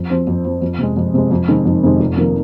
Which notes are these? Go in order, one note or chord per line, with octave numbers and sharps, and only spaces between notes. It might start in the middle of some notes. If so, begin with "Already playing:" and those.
Already playing: F2
F3 C4
F2
F3 C4
F2
C3 G#3
F2
C3 G#3
F2
C3 D#3 G#3
F2
C3 D#3 G#3
F1
F2 D#3 A#3